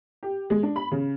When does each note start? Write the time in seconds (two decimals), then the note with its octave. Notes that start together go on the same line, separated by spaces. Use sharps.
0.23 G4
0.50 G#3
0.63 D4
0.76 B5
0.92 C#3